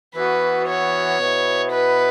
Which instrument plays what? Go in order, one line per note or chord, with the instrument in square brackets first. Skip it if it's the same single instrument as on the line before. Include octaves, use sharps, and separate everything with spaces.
[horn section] E3 B3 F#4 [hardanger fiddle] B4
[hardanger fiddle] C#5
[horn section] B2 B3 E4
[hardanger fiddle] B4